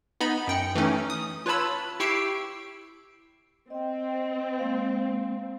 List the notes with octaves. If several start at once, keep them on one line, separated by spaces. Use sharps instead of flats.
B3 D#4 D#5 B5
F#2 G5 C#7
E3 A3 C#4 D#4
D#6
F4 B4 C#5 A5 B5 E6
E4 G4 C#6 E6 C7 D7
C4 D#5 G5
G#3 A#3 F5